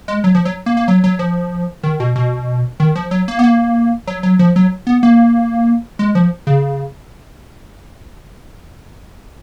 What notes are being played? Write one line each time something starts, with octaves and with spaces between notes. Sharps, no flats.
G#3
F#3
F3
F#3
A#3
A#3
F#3
F#3
F3
D#3
B2
B2
D#3
F3
F#3
A#3
B3
A#3
F#3
F#3
F3
F#3
B3
A#3
G#3
F3
C#3